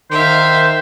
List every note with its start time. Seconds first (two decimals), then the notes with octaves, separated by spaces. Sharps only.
0.11 D#3 C5 E5 F5